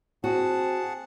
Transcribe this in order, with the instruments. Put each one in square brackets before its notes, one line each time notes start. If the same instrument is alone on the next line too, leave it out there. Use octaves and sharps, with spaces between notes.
[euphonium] C4 [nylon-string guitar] F#4 [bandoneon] G#4 F#5 A5